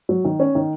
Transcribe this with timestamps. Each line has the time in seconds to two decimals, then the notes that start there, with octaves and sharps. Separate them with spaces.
0.09 F#3
0.24 D#3
0.40 C#4
0.55 D#3